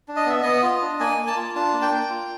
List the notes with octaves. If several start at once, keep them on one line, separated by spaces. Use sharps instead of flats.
D4
D#5
B3 E5
B3 D#5
F4
D4
A#3 G#5
A#3
A5
F4
D4 A5
A#3
G5
A#3
F4